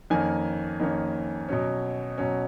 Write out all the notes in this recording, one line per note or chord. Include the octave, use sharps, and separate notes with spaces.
F2 D#3 A#3 C#4 G#5
F2 D#3 A#3 C#4
B2 F#3 C#4
B2 F#3 C#4